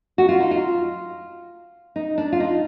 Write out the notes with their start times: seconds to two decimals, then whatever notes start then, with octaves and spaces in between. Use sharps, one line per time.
0.18 F#4
0.29 F4
0.40 D#4
0.51 F4
1.96 D#4
2.18 D4
2.32 F4
2.40 D#4